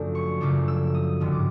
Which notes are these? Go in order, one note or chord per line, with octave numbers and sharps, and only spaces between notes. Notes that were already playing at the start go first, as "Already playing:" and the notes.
Already playing: F#2 C#3 F3 A3 D4
C#6
F#2 C#3 F3 A3 D4 D6
E6
D#6
G#1 G2 D3 G3
D6